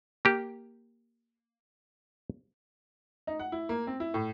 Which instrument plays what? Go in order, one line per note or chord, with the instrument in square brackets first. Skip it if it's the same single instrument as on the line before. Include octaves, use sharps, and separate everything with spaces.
[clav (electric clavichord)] A#3 G4
[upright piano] D#4
F#5
E4
A#3
C4
E4
A2